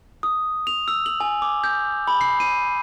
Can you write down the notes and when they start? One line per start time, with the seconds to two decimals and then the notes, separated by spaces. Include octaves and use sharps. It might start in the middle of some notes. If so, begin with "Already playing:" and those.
0.23 D#6
0.67 F7
0.88 E6
1.06 F#7
1.20 G#5
1.42 D6
1.64 G6
2.07 B5
2.21 C7
2.40 D#7